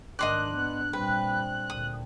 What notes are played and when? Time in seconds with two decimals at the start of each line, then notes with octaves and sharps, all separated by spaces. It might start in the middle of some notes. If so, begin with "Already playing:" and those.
0.19 G#2 D#3 D4 D#5 C6 D6 F#6
0.54 B3
0.93 A#2 G3 C4 B4
1.70 D2 A#2 D#6